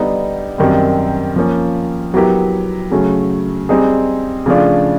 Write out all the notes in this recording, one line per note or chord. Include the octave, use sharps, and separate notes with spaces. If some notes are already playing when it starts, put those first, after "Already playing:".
Already playing: D3 G3 B3 D#4
F#2 D#3 G3 C4
F3 A#3 C#4
F#3 B3 E4 G4 A#4
C#3 F#3 A3 C#4
G3 C4 D#4 G#4
C#3 F3 A3 D4 F4